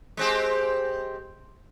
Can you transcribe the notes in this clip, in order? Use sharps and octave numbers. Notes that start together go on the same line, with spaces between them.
G#3 C4 G4